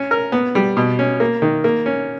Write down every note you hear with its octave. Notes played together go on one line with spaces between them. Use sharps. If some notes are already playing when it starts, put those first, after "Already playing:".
Already playing: C#4
A#4
B3
G3
B2
C#4
A#3
D#3
A#3
C#4